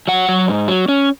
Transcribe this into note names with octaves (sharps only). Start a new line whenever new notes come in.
F#3 F#5
F#3
G#2
F#3
C#4